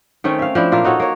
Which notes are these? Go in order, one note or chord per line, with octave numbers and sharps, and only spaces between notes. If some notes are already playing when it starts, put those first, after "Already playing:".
D#3 A3 C4 C#4
E5 F5
F3 D4 E4
A#2 A#3 F4 E5
D#4 F#4 A4 C#5
A#3 C#5